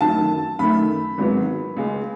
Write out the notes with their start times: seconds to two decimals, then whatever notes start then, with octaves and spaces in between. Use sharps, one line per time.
0.01 F#2 D#3 F#3 A3 A5
0.59 F#2 D#3 A3 B5
1.18 G#1 G#2 F#3 B3
1.77 C#2 C#3 G#3